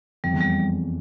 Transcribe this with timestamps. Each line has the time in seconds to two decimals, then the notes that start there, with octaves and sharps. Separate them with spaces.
0.24 F2 G3
0.33 E2
0.41 G3